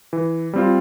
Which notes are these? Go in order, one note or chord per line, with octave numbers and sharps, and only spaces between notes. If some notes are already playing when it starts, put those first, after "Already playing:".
E3
G3 C4 F4